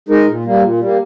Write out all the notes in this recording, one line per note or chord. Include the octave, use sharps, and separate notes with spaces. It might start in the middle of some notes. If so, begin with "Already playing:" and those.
G#3 D#4 A#4
A#2
G3 A#3
A#2
G3 A#3